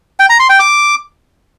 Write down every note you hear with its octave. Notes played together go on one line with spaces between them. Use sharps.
G5
A#5
C6
G5
D6